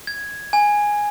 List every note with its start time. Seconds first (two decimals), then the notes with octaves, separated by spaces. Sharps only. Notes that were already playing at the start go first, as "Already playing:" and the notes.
0.07 G#6
0.53 G#5